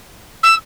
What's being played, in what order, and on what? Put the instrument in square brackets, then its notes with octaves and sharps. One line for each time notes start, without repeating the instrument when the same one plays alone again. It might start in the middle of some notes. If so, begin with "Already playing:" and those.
[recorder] E6